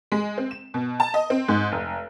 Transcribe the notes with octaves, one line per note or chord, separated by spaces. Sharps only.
G#3
C4
E7
B2
A5
D#5
C4
G#2
F1